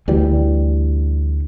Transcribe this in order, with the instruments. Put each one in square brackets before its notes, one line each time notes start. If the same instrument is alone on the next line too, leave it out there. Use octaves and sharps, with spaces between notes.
[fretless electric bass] D2 E3 G3